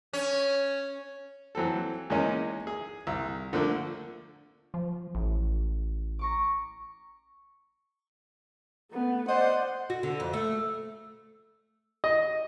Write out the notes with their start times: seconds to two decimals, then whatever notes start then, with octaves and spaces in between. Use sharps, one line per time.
0.13 C#4
1.55 E3 F#3 C4 A4
2.10 E2 G#3 A#3 C#4 D#4
2.67 G#4
3.07 C2
3.53 D3 F3 A3 A#3
4.74 F3
5.15 A1
6.19 A#5 C#6 D6
8.91 A3 B3
9.28 C5 D5 D#5 F#5
9.90 F#4
10.03 D3
10.20 F2
10.33 A3
12.04 D#5